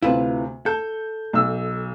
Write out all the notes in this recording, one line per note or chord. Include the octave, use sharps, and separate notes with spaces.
D2 C3 E4 F4 B4
A4 G6
B1 E6